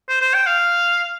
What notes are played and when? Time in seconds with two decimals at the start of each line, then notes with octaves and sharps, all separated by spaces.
0.09 C5
0.21 C5
0.34 G5
0.46 F5